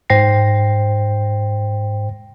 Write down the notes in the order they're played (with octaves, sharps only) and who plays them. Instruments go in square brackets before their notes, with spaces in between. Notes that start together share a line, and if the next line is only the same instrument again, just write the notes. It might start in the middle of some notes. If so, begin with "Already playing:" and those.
[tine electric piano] G#2 C5 G5 A#6 C7